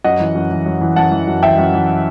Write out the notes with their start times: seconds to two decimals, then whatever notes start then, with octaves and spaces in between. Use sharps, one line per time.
0.04 F#2 D#5 F#5
0.20 E3
0.35 F#2
0.51 E3
0.66 F#2
0.81 E3
0.96 F#2 F#5 A5
1.11 E3
1.27 F#2
1.43 E3 E5 G5
1.58 F#2
1.74 E3